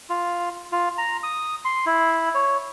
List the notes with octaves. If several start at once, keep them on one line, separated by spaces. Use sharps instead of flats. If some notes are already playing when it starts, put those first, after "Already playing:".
F4
F4
A#5
D#6
C6
E4
C#5